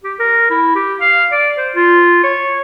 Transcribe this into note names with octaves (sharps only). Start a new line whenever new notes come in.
G4
A#4
E4
G4
F5
D5
C5
F4
C#5